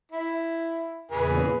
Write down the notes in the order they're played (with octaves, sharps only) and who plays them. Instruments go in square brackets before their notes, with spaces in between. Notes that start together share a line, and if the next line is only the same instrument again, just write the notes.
[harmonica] E4
[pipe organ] E2 A#2 C#3 [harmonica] G#4 B4 G#5